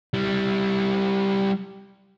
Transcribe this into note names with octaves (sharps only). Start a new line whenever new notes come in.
G3 E4